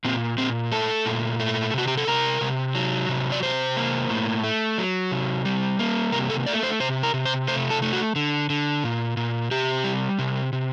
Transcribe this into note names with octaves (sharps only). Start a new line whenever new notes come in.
A#2 C4
A#2 C4
A3 A4
A#2
A3
C3 F#4
G4
A4
C3 A#4
C3
F#3
C3
D5
C3 C5
A#3
A2
A3
F#3
C3
G3
A#3
C3 A#4
A4
A3 D5
C5
C3 C5
A#4
C3
C5
A3 C5
A4
A3
F#4
D3
D3
A#2
A#2
C3 G4
G3
C3
C3